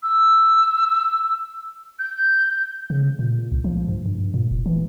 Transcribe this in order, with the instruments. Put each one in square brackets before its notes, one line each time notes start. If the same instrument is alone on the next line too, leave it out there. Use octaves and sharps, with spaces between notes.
[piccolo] E6
G6
[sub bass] C#3
A#2
C2
F3
G2
G2
A#2
F1
E3